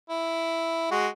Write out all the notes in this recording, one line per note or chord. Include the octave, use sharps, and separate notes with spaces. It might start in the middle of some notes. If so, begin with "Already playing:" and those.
E4
G#3 F#4